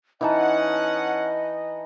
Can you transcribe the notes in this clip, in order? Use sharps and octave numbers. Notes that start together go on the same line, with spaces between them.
E3 C#4 D#4 D#5 F#5 A5